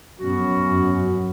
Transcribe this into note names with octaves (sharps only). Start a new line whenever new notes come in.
F#2 B3 C#4 F#4